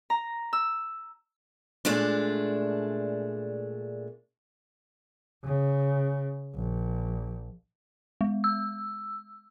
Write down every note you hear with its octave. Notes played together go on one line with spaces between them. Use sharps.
A#5
E6
A#2 G#3 A3 D4
C#3
A#1
G#3
E6